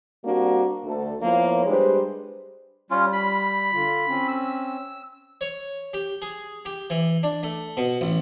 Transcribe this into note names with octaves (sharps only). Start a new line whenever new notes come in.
G3 A#3 C4 D4 F#4
D2 A4
F3 A#3 B3 E4 A#4 C#5
G3 G#3 D4 G4 B4 C5
G3 C#4 F4
B5
D3 F4
C4 C#4
E6
C#5
G4
G#4
G4
E3
D4
A3
B2
A1